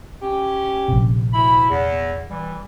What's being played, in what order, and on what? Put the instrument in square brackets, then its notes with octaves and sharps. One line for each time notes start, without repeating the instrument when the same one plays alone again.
[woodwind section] C#4 G4
[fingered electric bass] A#1 C3
[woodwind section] D2 E4 B5
E2
E3 G3